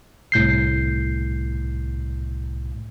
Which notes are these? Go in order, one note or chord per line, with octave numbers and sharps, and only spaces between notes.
C2 A2 G6 C7